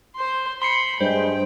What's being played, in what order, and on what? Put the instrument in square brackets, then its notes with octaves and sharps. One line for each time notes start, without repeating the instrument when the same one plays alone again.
[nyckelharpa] C5 C6
[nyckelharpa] B5 [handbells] C6 C7 C#7
[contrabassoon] G2 [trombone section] G#3 [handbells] C5 [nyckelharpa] G5